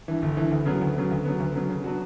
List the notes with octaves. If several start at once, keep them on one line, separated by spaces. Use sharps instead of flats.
G2 E3
G1
G2 E3
D2
C#3 F#3 B3
D2
C#3 F#3 B3
D2
C#3 F#3 B3
D2
C#3 F#3 B3
C#3
F#3 B3 D4 F#4